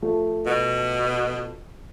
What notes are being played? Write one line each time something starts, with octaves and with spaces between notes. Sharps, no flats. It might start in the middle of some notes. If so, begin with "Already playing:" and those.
F3 A3
B2